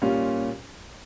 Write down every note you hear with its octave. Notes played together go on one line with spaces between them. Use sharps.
A#2 G3 C#4 F4